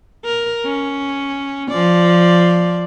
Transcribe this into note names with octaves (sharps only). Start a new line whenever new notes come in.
A#4
C#4
F3 D5